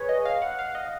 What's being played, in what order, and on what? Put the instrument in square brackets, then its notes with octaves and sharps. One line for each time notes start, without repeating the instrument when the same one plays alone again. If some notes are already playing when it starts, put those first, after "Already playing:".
Already playing: [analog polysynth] G#4 B4 C#5
D#5
F5
F#5
F5
D#5